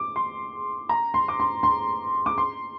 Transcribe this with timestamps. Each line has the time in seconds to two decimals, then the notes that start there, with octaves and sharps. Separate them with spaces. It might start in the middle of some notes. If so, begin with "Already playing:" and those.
Already playing: D6
0.16 C6
0.89 A#5
1.14 C6
1.28 D6
1.40 C6
1.63 C6
2.26 D6
2.38 C6